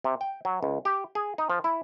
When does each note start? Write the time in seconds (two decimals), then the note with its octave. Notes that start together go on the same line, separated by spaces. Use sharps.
0.04 C3
0.21 G5
0.45 F#3
0.63 C#2
0.85 G4
1.15 G#4
1.38 D#4
1.50 F3
1.64 E4